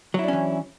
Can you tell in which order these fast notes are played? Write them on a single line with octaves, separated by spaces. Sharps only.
F#3 E4 D4 C#4 E3